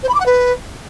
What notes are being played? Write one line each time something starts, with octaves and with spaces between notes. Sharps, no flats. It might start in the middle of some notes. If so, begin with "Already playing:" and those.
C5
B5
D6
F#5
B4